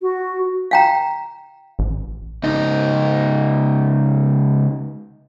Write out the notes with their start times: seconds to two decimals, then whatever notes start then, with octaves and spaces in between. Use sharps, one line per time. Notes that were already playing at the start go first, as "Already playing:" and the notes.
0.02 F#4
0.71 F5 G5 A#5
1.79 A1
2.43 C#2 D#4